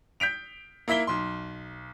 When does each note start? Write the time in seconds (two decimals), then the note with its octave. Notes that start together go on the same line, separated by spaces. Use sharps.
0.20 G6 B6 D7 F7
0.88 A#3 E4 E5 B6 G7
1.07 B1 C6